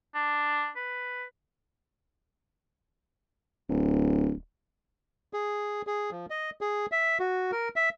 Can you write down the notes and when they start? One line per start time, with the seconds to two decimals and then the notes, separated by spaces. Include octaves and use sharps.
0.15 D4
0.76 B4
3.69 D1
5.33 G#4
5.87 G#4
6.11 F3
6.30 D#5
6.61 G#4
6.92 E5
7.19 F#4
7.52 A#4
7.76 E5